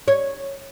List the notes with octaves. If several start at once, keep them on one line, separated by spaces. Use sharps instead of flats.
C#5